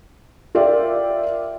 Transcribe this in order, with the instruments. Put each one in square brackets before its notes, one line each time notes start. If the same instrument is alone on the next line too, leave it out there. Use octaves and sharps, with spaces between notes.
[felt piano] F4 G4 A#4 D5 E5 G5